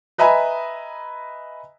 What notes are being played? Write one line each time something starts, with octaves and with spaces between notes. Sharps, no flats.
B4 D#5 E5 G#5 A#5 B5